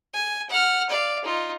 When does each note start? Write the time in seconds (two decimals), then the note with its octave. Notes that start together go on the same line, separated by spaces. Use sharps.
0.14 G#5
0.50 F#5 F6
0.90 D5 F5
1.24 D#4 F4